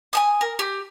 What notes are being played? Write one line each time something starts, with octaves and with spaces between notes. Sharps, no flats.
G#5 A5 D#6
A#4
G4